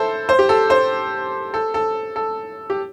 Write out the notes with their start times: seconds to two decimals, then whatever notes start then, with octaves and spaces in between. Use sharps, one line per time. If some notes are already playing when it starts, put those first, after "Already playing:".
Already playing: E4 A4 C5
0.29 C5
0.39 G4
0.49 A4
0.70 C5
1.54 A4
1.74 A4
2.16 A4
2.70 G4